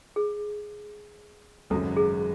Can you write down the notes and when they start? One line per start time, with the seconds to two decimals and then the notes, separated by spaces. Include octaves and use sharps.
0.16 G#4
1.70 G#1 F#2 C#3 F#3 A4
1.97 G#4